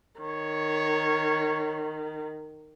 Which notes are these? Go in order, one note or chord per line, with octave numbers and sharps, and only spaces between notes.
D#3 C#5